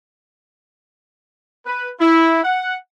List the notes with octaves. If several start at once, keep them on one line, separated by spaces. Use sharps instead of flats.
B4
E4
F#5